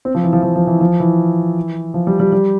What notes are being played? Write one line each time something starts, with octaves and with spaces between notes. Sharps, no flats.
C4
F3
E3
F3
F3
F3
E3
F3
E3
F3
G3
G3
G3